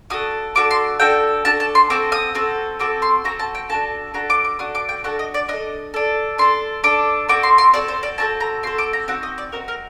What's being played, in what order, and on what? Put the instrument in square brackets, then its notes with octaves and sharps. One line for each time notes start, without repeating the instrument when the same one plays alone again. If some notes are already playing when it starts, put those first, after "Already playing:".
[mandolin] D4 F#4 A4 D#6
D4 F#4 A4 D6
C6
D4 F#4 A4 G5
D4 F#4 A4 A5
A5
C6
C4 F#4 A4 D6
D#6
C4 F#4 A4
C4 F#4 A4 D6
C6
C4 F#4 A4 A#5
A5
G5
D4 F#4 A4 A5
D4 F#4 A4 A#5
D6
D6
D4 F#4 A4 D#6
D6
G5
D4 F#4 A4 F#5
D#5
D5
D4 A4 D#5
D4 A4
D4 A4 C6
D4 A4 D6
C4 F#4 A4 D6
C6
C6
C4 F#4 A4 D5
C5
D5
C4 F#4 A4 A5
A#5
C4 F#4 A4 C6
D6
A#5
C4 D#4 F#4 F#5
D#5
D5
C4 D#4 F#4 A#4
A#4